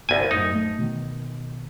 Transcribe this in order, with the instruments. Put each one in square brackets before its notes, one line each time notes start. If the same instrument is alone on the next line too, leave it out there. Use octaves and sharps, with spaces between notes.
[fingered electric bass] G1 [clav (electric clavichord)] C2 G#5
[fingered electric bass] F#2 A2 [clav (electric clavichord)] D#4
[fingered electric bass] A3
B2 D#3